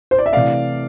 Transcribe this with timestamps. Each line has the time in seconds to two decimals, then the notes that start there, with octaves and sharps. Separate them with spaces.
0.11 C5
0.18 D5
0.26 E5
0.33 C3 E3 A3 D5 F5